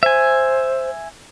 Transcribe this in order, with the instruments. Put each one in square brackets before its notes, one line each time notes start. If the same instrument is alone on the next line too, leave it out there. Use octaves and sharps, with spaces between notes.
[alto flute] C5 [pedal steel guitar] E5 G#5